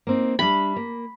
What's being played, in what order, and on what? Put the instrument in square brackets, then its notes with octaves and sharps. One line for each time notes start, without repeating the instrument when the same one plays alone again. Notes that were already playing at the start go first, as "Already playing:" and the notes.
[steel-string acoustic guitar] A#3 C4 D#4
[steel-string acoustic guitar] G3 D4 E5 [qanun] B5
[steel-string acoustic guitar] A#3